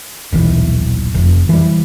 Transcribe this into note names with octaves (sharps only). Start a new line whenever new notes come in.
D#1 B1 E3
F1 F2
E3 G3